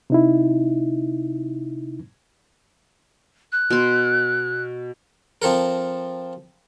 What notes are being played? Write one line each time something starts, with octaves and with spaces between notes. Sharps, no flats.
C3 D#4 E4
F#6
B2 C6
F3 C4 A4 A#4